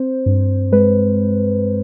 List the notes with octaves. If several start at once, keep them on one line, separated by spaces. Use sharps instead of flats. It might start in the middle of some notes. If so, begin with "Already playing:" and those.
Already playing: C4 C5
G2
G#3 B4